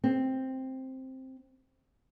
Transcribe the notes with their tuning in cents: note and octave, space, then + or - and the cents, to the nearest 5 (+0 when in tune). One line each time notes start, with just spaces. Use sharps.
C4 +5